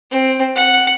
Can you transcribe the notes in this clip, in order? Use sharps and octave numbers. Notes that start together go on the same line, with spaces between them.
C4
F#5